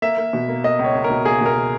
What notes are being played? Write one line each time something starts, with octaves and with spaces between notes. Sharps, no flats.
A#3 E5
A#3
B2
A#3
A#3 D#5
C#2
C#5
C#2
A#4
B2
A#3 G#4
B2 A#4